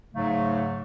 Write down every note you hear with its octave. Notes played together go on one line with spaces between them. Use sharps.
G#2 C#3 F#3 A3